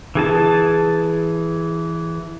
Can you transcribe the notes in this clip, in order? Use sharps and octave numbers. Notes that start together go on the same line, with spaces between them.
E3 G#4 A5